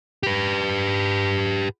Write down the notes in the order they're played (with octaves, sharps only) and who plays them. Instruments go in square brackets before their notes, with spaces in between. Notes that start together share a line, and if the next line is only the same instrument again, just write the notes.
[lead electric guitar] G4 B4